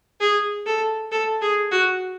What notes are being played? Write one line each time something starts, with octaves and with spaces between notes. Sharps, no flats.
G#4
A4
A4
G#4
F#4